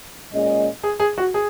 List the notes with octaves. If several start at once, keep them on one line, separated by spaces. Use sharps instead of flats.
A#2 G#3 C#4 G#4 D#5
G#4
G#4
F#4
G#4